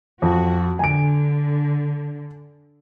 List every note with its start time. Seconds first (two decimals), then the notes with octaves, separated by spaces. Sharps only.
0.22 F2 F#4
0.79 D3 G#5 D7